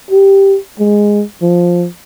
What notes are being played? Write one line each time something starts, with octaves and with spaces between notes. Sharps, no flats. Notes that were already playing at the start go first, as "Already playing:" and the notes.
G4
G#3
F3